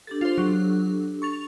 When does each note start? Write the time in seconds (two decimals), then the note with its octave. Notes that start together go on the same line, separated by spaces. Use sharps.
0.07 D4 G4 A4 A6
0.21 F4 C5
0.38 F#3
1.22 C#6 A6 F7